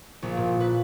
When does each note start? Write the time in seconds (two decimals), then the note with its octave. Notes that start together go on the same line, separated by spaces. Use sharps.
0.22 A#1
0.37 A#2
0.60 B4